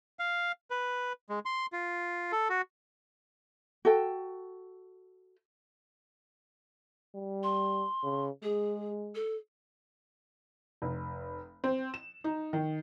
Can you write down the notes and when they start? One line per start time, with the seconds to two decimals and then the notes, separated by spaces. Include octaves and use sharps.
0.19 F5
0.70 B4
1.30 G#3
1.45 C6
1.73 F4
2.32 A4
2.50 F#4
3.85 F#4 A4 G5
7.15 G3
7.43 C6
8.04 C#3
8.43 G#3 G#4
9.15 A4
10.82 F1
11.64 C4
11.94 E7
12.24 D#4
12.53 D#3